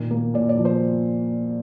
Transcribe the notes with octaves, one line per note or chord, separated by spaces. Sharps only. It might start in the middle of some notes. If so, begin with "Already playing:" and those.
Already playing: A#2 D#3
A#3
A#2 D5
D5
F3
C5